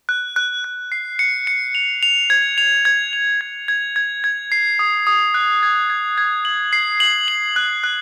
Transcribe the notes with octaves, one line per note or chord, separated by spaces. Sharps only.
F#6
F#6
F#6
C7
C#7
C#7
F7
F7
G#6
F7
G#6
F7
G#6
G#6
G#6
G#6
C7
D#6
D#6
F#6
G#6
G#6
G#6
F#7
C7
F#7
F#7
F#6
F#6